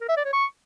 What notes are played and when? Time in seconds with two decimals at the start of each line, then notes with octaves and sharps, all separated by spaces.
0.01 A#4
0.09 E5
0.17 D5
0.25 C#5
0.33 C#6